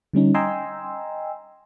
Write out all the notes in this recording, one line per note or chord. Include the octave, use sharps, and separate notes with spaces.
D3 G3 C#4 D#4
D#5 G5 G#5 A#5 C6 E6